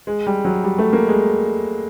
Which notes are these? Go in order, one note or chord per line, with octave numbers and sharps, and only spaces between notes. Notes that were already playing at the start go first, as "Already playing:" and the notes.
G#3
G3
F#3
G3
A3
A#3
G#3